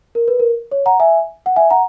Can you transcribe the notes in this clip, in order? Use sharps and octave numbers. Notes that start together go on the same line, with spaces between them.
A#4
B4
A#4
C#5
F#5 A#5
E5 G#5
F#5
E5 G#5
F#5 A#5